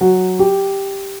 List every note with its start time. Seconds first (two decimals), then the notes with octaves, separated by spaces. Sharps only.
0.01 F#3
0.39 G4